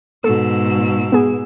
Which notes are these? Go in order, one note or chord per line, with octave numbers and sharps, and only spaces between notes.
G#2 B2 A4 E6
B3 G#4